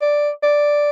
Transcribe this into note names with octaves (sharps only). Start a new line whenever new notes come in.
D5
D5